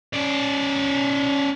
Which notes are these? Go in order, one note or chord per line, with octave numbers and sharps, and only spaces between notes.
C#4 D5